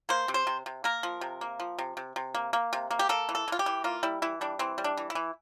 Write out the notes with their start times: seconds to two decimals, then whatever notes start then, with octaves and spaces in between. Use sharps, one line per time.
0.09 A#3 C5
0.28 C3
0.34 C5
0.47 C3
0.66 C3
0.84 A#3 A#4
1.03 F3
1.21 C3
1.41 A#3
1.60 F3
1.79 C3
1.97 C3
2.16 C3
2.35 A#3
2.53 A#3
2.73 C3
2.91 A#3
2.99 G4
3.09 A#3 A4
3.29 E3
3.35 A4
3.48 E3 F4
3.59 G4
3.66 E3
3.84 A#3 F4
4.03 G3 E4
4.22 E3 E4
4.41 G3 D4
4.59 E3 C4
4.78 G3
4.84 D4
4.97 E3
5.10 E4
5.15 E3